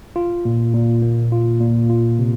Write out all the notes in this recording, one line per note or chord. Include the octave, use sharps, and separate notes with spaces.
F4
A#2
A#2
A#3
F4
A#2
F4
C3